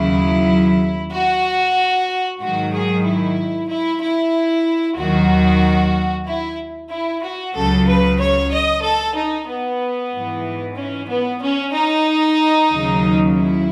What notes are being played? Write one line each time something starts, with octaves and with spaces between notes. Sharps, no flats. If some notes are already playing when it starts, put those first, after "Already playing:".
Already playing: D#2 C#3 F#3 E4
F#4
G#2 D#3 F#3 F#4
G#4
E4
E4
E4
D#2 D#3 F#3 F#4
E4
E4
F#4
C#2 C#3 F#3 A4
B4
C#5
D#5
A4
D#4
B3
G#2 E3
C#4
B3
C#4
D#4
D#2 C#3 F#3
E4